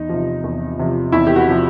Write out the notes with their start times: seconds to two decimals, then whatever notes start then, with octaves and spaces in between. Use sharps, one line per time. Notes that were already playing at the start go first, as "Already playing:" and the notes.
Already playing: E2 D#4
0.09 C3 F3
0.44 E2
0.79 C3 F3
1.12 E2 E4
1.27 G4
1.36 F#4
1.48 C3 F3